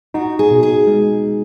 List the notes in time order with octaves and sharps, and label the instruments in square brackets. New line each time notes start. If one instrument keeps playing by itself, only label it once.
[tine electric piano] D#4 [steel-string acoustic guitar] F#4
[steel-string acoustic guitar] G#4
[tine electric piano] B2
[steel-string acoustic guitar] G#4
[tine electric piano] G#3